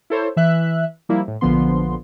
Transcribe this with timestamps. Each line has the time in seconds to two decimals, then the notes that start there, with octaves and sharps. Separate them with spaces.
0.10 E4 A4 C5 C#5
0.37 E3 E5 F#6
1.09 F3 G3 A#3 E4
1.28 A2
1.41 A#1 D3 F3 B3 C6